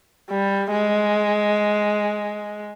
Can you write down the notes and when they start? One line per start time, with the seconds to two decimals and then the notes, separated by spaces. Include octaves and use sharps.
0.30 G3
0.72 G#3